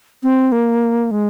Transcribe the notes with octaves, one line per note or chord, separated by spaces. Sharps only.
C4
A#3
G#3